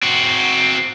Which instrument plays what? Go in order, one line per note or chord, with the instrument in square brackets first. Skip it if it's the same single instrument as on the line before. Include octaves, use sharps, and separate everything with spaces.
[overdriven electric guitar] C4 F#4